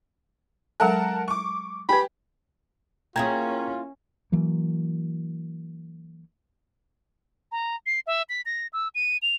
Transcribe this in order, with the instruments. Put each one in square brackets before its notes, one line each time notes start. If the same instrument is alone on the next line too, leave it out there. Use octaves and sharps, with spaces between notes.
[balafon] F#3 G#3 A4 [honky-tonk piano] A#4 F#5 A5
[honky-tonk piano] C#6 D6
[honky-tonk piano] G4 [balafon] B4 G#5 [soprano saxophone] B5
[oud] A#3 E4 G#4 [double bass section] C#4 [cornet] F4 [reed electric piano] G5 A#5 G#6
[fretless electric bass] E3 F#3 A#3
[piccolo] A#5
C7
E5
B6
A#6
E6
D#7
F7